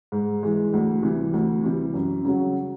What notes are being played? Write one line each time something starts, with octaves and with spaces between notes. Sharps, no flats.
G#2
E3 G#3
D2
C3 E3 G3
D2
C3 E3 G3
F#2
C#3 F#3